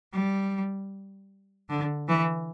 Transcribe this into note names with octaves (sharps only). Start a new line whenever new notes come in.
G3
D3
E3